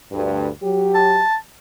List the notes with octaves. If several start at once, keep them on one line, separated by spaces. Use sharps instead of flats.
D2 G2
F#3 G4
A5